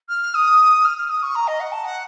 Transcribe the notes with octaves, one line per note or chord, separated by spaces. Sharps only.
F6
D#6
F6
F6
D#6
C#6
A#5
D#5
F#5
A5
F#5